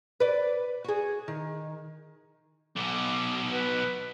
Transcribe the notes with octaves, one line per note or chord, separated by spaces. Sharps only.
B4 D5
F#4 G#4
D#3
B1 B2 D6
B4